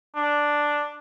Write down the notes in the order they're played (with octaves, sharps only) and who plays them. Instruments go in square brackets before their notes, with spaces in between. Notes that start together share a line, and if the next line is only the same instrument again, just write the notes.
[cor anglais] D4